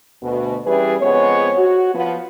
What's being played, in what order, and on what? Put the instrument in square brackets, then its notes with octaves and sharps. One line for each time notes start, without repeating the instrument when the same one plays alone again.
[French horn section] D2 B2
E3 G3 C#4 E4 G#4 B4
F2 G#3 B3 C4 C#5
F#4
F3 B3